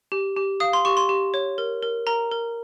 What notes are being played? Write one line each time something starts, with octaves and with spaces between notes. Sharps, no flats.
G4
G4
F5 D#6
C6
G4 C#6
C6
G4
C#5
A#4
A#4
A#4 A#5
A#4